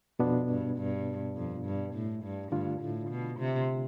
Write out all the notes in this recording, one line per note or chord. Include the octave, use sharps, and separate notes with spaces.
F2 B2 B3 D4
G2
G2
F2
G2
A2
G2
G2 D3 A3 D4 F4
A2
B2
C3